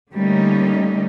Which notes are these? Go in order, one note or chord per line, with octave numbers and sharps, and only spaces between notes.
D3 G3 A3 A#3 C#4 D#4